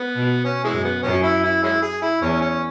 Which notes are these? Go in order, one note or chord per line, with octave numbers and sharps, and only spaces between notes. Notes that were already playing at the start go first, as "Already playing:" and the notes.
Already playing: B3
B2
C#4
E3 G#3
F#2
B3
F#2 C#4
E4
E4
G#3 C#4 E4
G#4
E4
E2 C#4
C#4